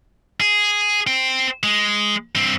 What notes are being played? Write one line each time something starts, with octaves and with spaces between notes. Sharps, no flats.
G#4
C5 G5
G#3
G2 C4